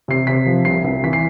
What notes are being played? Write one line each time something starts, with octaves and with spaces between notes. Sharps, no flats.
C3 C7
C3 B6
F3
C2 C7
C2
E3 B6
C7